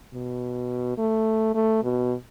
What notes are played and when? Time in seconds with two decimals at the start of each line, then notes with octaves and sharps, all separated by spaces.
0.14 B2
0.98 A3
1.55 A3
1.83 B2